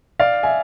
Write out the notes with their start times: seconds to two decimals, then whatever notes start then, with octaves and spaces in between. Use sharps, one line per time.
0.20 D5 F5
0.43 E5 G#5